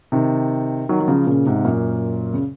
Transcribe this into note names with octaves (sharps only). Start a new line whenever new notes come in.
C3 D#3
D#3 F#3
F#3
C#3 F3
A#2 C#3
G#2 C3
F#2 A#2
C#3